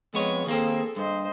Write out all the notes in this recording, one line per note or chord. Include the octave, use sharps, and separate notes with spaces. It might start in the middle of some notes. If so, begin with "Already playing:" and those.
F2 G#3 B3 C#5
D#2 A#3 C4 G#4 A4
G2 C5 D#5